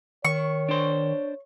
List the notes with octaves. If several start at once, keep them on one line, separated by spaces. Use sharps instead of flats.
D#3 C#5 C#6
D4 C5